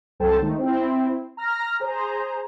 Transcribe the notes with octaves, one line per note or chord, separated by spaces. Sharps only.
C2 F#3 A4 C5 G5 A5
D#3 G#3 A3 D#4
C4 E4
A#5 F6 A#6
G#4 C5 A#5